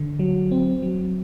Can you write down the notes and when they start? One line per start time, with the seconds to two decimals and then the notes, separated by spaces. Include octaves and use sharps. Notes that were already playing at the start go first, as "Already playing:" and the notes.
Already playing: D3
0.19 F#3
0.51 C4
0.82 F#3